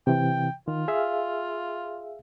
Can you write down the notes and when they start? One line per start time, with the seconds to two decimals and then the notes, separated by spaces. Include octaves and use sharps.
0.07 C3 E3 G5
0.68 D#3 F4
0.88 G#4 E5 F5